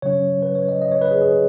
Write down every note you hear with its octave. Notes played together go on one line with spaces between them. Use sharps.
C#3 F#3 C#4 C#5
B4
C#5
D#5
D#5
C#5
B4
G#4
G#4